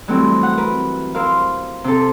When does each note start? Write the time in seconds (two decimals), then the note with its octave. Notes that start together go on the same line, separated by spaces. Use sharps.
0.08 E3 F#3 G3 A3 C4 E4
0.43 F#5
0.58 A#4 B4
1.15 E4 A#4 C5 F5
1.84 C3 A4